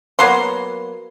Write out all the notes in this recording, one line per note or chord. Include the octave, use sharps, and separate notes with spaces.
F#3 A#3 B3 C6